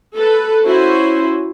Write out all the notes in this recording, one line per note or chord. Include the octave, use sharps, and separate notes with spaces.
A4 B4
C#4 E4 F#4 C5